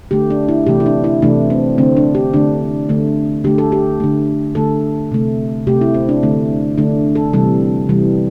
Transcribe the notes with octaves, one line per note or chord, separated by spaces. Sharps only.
D3 A3 G4
D4
E4
C3 E3 A3 G4
E4
D4
E4
C3 E3 A3 D4
C4
D3 A3 C4
D4
G4
D3 A3 D4
D3 A3
D3 A3 G4
A4
G4
D3 A3
D3 A3 A4
C3 A3
C3 A3 G4
E4
C4
D4
D3 A3
D3 A3 D4
A4
C3 E3 G3 A4
C3 E3 G3